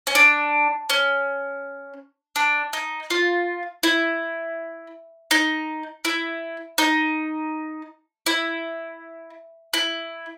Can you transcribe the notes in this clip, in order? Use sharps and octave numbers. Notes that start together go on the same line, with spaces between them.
C#4
D4
C#4
D4
D#4
F4
E4
D#4
E4
D#4
E4
E4